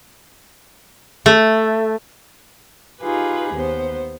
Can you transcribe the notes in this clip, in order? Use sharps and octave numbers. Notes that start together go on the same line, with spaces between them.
A3
D#4 F4 G4 G#4 B4
D#2 B3 C5